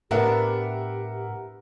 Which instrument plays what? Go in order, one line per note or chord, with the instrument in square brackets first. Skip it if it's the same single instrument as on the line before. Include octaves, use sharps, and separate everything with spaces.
[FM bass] A2 [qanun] B3 D4 E4 [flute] G4 [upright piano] A#4 E5 F#5